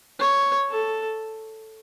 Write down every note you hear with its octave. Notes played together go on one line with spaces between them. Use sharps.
C#5
A4